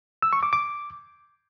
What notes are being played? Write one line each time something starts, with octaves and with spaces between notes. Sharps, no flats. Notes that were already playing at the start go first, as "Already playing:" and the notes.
E6
C#6
D6
D6